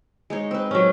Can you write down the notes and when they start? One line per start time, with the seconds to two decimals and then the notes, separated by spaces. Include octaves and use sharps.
0.30 G#3 D#4 C#5
0.51 C4 B4
0.71 F#3 C#4